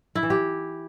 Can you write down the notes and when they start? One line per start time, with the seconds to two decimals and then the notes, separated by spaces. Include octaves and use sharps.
0.15 E4
0.23 E3
0.30 G4